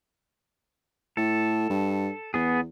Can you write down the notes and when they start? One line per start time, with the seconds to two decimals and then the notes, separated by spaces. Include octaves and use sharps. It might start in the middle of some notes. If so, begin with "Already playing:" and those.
1.17 A2 A4
1.69 G2
2.34 E2 B3 G#4